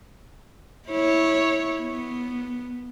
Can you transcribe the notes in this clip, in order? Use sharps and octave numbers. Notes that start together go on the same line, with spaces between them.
E4 C#5
B3